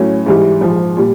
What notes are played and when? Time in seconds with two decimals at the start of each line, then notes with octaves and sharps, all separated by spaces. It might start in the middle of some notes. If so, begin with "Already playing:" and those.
Already playing: A2 F#3 A3 C#4
0.26 G#2 E3 G3
0.61 A#1 G#2 F3
0.97 A#2 G3